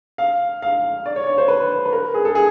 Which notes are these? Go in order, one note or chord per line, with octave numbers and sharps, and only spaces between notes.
F5
F5
D5
C#5
C#5
C5
B4
B4
A#4
G#4
A4
G#4